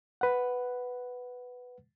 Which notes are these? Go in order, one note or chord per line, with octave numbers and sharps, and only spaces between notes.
B4 F#5